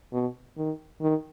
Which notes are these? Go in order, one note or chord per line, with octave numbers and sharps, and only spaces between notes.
B2
D#3
D#3